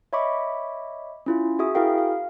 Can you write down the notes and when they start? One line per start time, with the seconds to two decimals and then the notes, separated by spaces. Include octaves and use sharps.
0.13 C#5 D#5 E5 B5 C#6 D6
1.26 C#4 E4 F4
1.59 F#4 G#4 E5 D#6
1.75 E4 F#4 G#4 A#4 F5 G5
1.98 F5